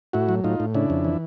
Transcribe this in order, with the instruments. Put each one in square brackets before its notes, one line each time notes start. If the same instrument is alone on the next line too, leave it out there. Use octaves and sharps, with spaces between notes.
[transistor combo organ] A2 E4 F#4
F#3
A2 D#4 F4
A2
C#3 D4 E4
F2
E3